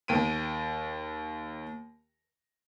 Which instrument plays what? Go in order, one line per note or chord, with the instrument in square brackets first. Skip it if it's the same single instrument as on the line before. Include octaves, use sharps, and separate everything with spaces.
[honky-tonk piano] D#2 G5 D7 D#7